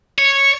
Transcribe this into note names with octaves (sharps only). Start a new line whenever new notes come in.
C#5